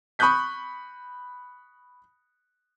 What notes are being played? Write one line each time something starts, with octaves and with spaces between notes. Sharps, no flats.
B5 C#6 D#6 F#6 G6 B6